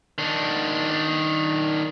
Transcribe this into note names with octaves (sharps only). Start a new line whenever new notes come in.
D#3 D4